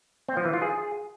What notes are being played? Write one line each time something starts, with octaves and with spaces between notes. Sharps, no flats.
C4
F3
E3
F4
G#4